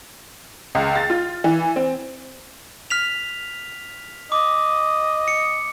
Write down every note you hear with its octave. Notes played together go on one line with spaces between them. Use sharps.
C#2
A6
F4
E3
C4
F6 B6 F7
D#5 D6
C#7